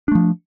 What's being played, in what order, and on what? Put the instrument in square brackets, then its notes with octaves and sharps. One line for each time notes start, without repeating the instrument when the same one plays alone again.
[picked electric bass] D4
A3
F3